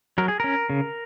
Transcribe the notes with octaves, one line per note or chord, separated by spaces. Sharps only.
F#3 A#4
G#4
C#4 A#4
C#3